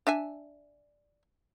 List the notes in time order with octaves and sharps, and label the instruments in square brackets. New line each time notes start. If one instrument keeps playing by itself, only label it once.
[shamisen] D4 E5 G#5